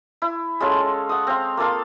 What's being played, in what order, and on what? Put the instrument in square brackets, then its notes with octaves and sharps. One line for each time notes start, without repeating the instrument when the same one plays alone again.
[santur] E4
G#3 C#4 F4 A4
F#5 D#6
C4 F5
A#3 F4 A4 F5